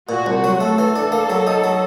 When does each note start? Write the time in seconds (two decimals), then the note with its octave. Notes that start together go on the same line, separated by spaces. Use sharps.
0.09 A#2 F#4
0.26 C2
0.44 F#3
0.60 A3 A4
0.78 E3
0.96 D4
1.12 A#3
1.30 F#3
1.47 D#4
1.64 F#3